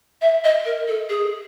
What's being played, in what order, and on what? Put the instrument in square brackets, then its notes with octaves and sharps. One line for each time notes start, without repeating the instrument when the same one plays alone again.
[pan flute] E5
D#5
A#4
A4
G#4